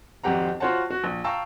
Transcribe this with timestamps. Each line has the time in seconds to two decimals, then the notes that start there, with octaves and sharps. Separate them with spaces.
0.23 G#1 F2 C4 G4 F#5 A#5
0.60 F4 F#4 C5 C#5 F#5 A5
0.90 F#4
1.04 A#1
1.24 F5 G5 A5 A#5 C#6 E6